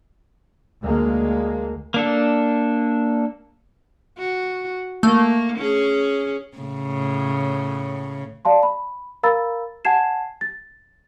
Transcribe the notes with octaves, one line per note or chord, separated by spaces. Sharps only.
D2 G#3 A#3
A#3 D4 A4
F#4
A3 A#3
C#4 G#4
A2 C#3
D5 F5 A5 C6
B5
A#4 F5 A#5 B5 E6 A6
F#5 G#5 A5 G#6 C7 E7
A6